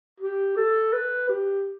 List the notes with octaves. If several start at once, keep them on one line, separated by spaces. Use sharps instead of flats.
G4
A4
B4
G4